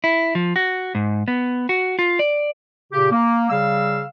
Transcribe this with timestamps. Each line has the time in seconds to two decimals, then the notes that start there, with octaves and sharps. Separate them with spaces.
0.04 E4
0.35 F3
0.56 F#4
0.95 G#2
1.28 B3
1.69 F#4
1.99 F4
2.19 D5
2.93 A#2 C#3 G4
3.12 A#3
3.50 C#3 G3 F5 E6